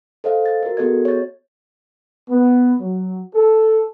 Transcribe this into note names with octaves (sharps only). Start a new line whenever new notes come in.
A4 C5 D#5 F5
A6
F#4 A#4
B3 F#4 G#4 A4 D#5 G#6
C#5 A6
B3
F#3
A4